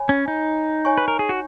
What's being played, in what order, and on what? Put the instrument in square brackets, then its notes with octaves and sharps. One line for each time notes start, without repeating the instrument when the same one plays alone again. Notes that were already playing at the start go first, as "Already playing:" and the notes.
Already playing: [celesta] C#5 G#5 B5
[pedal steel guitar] C#4
D#4
[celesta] C#5 G#5 C#6
[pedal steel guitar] B4
A#4
G#4
F#4